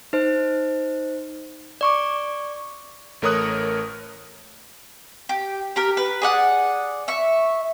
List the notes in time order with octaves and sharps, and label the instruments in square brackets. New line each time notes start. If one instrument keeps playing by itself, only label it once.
[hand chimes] D#4 C5
D5 C#6 D6
[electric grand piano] A1 A3 A#4 C#5 D#6 F#6
[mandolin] G4
G4 A#4
B4
G#4 D5 F#5
E5 C#6